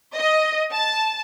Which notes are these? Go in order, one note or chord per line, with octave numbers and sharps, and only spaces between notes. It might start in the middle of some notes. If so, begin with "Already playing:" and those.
D#5
A5